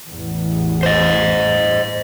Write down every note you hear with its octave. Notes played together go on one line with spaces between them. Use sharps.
A1 E2
C5 D#5